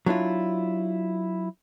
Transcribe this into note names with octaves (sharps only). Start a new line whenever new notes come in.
F#3 D4 E4 F4